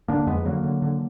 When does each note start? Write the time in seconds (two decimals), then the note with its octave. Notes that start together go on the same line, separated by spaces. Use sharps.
0.08 D3 A#3 D4
0.27 F2 G#3 B3
0.45 D3 F#3 A#3
0.64 D3
0.82 D3